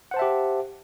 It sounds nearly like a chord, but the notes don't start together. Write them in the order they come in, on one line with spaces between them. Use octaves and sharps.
F#5 C5 A5 E5 G4